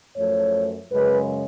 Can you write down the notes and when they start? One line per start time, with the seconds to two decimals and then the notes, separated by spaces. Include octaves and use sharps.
0.16 F#2 F3 A3 C#5
0.90 F#2 C#3 G#3 B4